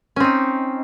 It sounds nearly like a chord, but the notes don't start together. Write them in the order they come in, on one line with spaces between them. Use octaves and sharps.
C#4 C4 D#4